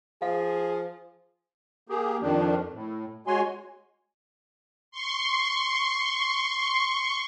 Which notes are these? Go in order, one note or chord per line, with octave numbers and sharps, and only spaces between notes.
F3 G#4 F5
A#3 G4 G#4
F2 D#3 F3 D4
A2
G#3 F#4 C#5 G#5 C6
C6 C#6